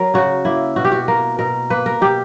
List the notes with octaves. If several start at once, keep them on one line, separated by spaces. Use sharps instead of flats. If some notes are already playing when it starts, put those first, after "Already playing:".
Already playing: F#3 A#4
C#3 F#4
A#3 E4
B2 F#4
G4
F#4
A#3 A#4
B2 A#4
A#3 B4
A#4
B2 G4